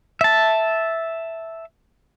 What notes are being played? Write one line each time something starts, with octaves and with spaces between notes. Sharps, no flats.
E5 A5